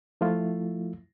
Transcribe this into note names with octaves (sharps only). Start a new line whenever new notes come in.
F3 A3 E4 F4